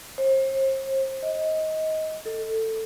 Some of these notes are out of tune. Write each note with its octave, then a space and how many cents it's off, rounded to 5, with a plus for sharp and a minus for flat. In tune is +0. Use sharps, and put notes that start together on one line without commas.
C5 +40
D#5 +20
A4 +15